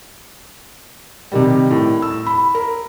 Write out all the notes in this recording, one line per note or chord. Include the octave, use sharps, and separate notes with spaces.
C3 D#3 G3
A2
E6
B5
A#4